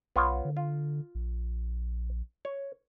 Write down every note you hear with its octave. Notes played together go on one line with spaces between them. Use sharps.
B1 B3 F4 C#5
D3
F4
A#1
C#5